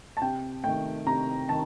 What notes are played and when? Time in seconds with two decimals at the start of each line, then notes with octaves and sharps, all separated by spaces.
0.17 A5
0.21 C3 G5
0.64 D#3 A3 G5
1.06 C3 A#5
1.49 D#3 A5